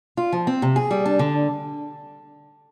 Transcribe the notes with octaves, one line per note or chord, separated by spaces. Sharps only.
F4
F3
C4
C3
G#4
G3
D4
D3